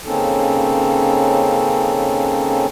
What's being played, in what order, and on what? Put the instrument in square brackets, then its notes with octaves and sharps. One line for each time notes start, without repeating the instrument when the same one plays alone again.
[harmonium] C#3 A#3 C4 C#4 D#4 A4